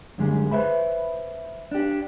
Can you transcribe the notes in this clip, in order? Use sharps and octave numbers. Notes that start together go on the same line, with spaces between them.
F#2 D3 G3 G#3
B4 C5 E5 B5
D4 G4